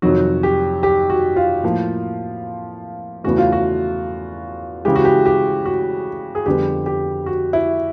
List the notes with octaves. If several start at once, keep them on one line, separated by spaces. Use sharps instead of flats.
F2 C3 D#3 F#3 F#4
G4
G4
F#4
F4
A2 F3 A#3
E2 C#3 E3 A3 F#4
F4
F#4
C#3 E3 G#3 G4
F#4
G4
G4
F#4
G#4
F2 D3 G3 B3 G4
G4
F#4
E4